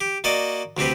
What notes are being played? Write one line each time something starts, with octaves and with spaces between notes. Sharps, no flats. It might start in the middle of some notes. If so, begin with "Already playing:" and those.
G4
A#3 F#4 D5 D#5
D2 C3 C4 G4 B4